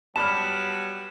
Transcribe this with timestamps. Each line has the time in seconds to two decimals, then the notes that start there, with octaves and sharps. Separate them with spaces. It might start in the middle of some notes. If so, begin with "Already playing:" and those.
0.16 F#3 G3 B3 A5 B5 F6 E7